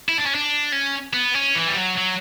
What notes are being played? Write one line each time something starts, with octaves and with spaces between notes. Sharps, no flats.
E4
D4
C#4
D4
C#4
B3
C#4
E3
G3
F#3
F#3